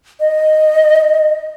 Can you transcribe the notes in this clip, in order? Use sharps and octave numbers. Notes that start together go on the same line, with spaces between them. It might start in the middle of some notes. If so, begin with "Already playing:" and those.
D#5